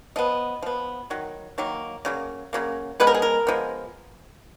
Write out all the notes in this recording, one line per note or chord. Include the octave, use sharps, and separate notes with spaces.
F3 B3 D#5
F3 B3
D#3 F#3
D#3 F#3 A#3
C#3 F#3 A#3
C#3 F#3 A#3
F3 G#3 B3 B4
A#4
G#4
A#4
F3 G#3 B3